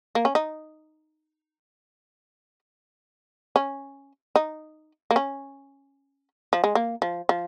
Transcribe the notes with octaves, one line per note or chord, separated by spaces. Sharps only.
A#3
C#4
D#4
C#4
D#4
A#3
C#4
F3
G#3
A#3
F3
F3